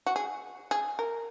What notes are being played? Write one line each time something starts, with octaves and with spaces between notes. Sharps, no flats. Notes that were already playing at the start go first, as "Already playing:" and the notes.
F#4
G#4
G#4
A#4